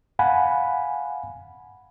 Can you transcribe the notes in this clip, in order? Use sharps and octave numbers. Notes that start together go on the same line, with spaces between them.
F5 F#5 G#5 B5